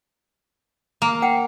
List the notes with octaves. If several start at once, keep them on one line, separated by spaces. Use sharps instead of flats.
A#3
F#5 G5